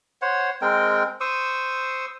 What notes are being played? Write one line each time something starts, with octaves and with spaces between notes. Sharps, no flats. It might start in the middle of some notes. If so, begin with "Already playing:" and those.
C5 C#5 F#5
G#3 C4 A#4 G5
C5 C#6 D#6 E6